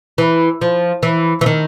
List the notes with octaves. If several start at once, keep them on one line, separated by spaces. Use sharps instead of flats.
E3
F3
E3
E3
D#3